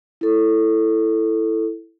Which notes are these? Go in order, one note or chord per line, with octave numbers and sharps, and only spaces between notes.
E4 A4